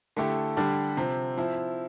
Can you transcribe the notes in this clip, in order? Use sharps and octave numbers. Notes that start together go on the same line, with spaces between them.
D3 A3 E4 G4
D3 G3 D4 G4
C3 F3 C4
F3 C4 E4